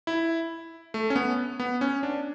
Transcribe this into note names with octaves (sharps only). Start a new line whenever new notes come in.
E4
A3
C#4
B3
B3
C#4
D4